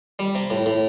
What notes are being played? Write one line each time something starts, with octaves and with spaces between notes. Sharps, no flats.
G3
C3
A2
A2